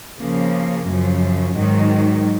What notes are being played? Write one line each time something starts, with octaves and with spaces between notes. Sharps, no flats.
C#3 F3 A#3
F#2 C#3 F3
G#2 D#3 F#3